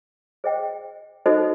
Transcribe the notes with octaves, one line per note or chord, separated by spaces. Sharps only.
G#4 C5 D#5 G5
D#4 F#4 A4 C5 D#5